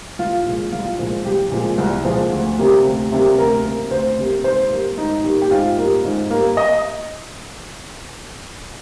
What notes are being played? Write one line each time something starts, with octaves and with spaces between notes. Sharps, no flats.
C2 F4
A#2 F3 G#3
C2 F4
A#2 F3 G#3
C2 G4
A#2 F3 G#3
C2
A#2 F3 G#3
D2
C3 G3 A#3
D2
C3 G3 A#3
D2 A#4
C3 G3 A#3
D2 C5
C3 G3 A#3
G#2 C5
G3 A#3
G#2 D#4
G3 A#3
G4
G#2 F4
G3 A#3
G#2
G3 A#3
D#5